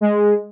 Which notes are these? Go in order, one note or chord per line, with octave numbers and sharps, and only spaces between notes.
G#3